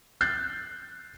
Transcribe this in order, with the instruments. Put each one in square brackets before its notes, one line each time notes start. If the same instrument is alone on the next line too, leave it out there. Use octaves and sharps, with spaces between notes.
[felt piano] F#6 G6 A6 C7